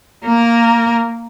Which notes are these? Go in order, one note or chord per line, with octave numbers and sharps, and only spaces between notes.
A#3 A#4